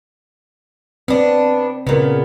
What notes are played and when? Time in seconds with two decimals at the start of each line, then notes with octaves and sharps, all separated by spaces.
1.08 B3 C4 D4
1.87 A#2 C#3 B3 A#4